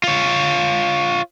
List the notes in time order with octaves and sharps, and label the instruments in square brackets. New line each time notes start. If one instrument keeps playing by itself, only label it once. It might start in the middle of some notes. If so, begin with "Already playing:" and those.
[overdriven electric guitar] F4 C#5